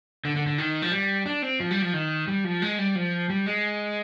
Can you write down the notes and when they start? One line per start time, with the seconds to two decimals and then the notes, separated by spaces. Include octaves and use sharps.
0.25 D3
0.36 D3
0.47 D3
0.58 D#3
0.82 F3
0.92 G3
1.26 D4
1.42 C4
1.60 F3
1.71 G3
1.82 F3
1.93 D#3
2.28 G3
2.44 F3
2.62 G#3
2.79 G3
2.95 F3
3.30 G3
3.46 G#3